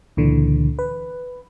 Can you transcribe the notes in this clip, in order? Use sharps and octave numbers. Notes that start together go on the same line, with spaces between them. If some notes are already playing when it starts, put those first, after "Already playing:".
C#2 A#2 D3 E3
B4